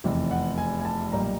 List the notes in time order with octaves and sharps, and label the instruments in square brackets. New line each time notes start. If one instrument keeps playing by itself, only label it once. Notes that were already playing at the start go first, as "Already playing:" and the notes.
[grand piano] F1 E2 C3 E3
F#5
G#5
G#5
A5
B1 A#2 G3 A#5